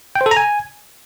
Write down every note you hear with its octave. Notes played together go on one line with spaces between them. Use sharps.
G5
C5
A4
A#5
G#5